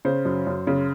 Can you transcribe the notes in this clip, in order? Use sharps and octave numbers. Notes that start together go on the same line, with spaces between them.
C#3 C5
F#2
F#2
C#3